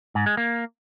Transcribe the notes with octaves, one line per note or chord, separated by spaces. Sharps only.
G#2
G#3
A#3